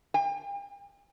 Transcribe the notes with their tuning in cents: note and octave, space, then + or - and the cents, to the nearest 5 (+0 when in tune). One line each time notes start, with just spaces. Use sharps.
G5 +40